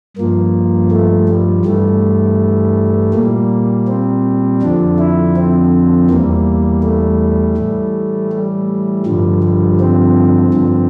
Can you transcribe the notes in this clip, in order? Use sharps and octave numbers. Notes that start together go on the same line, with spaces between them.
G2 F3 A#3
A3
G3
G2 E3 G3 A3
A#2 G3 A#3
C4
F2 D3 F3 D4
E4
C4
E2 E3 G3 A#3
A3
A2 E3 G3
G3
G2 D3 F3 G3
G3
C4
G2 D3 F3